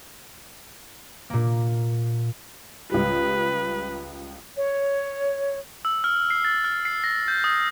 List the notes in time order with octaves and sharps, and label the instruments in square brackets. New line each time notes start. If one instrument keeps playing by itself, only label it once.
[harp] A#2 A#3
[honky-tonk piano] C#2 G3 [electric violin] B4
[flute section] C#5
[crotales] E6
F6
C7
A6
F6
C7
A#6
G6
D#6